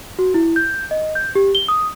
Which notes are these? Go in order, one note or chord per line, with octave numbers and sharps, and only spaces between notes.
F#4
E4
G6
D#5
G6
G4
G7
D#6